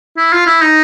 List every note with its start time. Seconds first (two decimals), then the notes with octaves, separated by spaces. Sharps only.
0.18 E4
0.33 F4
0.47 E4
0.61 D#4